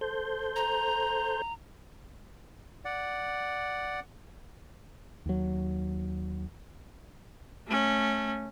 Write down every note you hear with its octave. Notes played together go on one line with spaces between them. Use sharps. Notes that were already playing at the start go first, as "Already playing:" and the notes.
A4 C5 G6
A#5
D5 F#5
D#2 F#3
A3 C#4